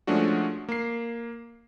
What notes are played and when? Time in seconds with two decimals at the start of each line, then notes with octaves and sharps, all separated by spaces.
0.07 F3 G#3 A3 C#4 D4 F#4
0.69 A#3 C7